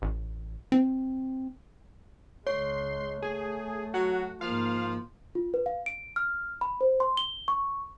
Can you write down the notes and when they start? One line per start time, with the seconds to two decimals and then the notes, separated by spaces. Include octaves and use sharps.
0.02 A1
0.72 C4
2.47 C#2 G#3 C#5 C6
3.22 A3 G#4
3.94 F#3 F#4
4.41 G#2 F3 A#3 F5
5.35 F4
5.54 B4
5.66 F5
5.86 D7
6.16 F6
6.61 B5
6.81 C5
7.00 C6
7.17 G7
7.48 C#6